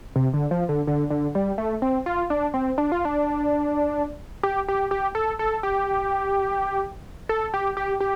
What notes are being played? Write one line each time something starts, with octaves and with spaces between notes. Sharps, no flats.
C3
D3
F3
D3
D3
D3
G3
A3
C4
F4
D4
C4
D4
F4
D4
G4
G4
G4
A4
A4
G4
A4
G4
G4
G4